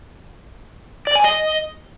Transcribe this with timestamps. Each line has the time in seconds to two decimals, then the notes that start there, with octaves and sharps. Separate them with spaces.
1.07 D5
1.16 G#5
1.24 D#5